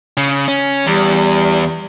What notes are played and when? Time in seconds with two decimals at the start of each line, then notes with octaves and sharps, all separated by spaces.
0.17 C#3
0.48 C#4
0.87 E2 G3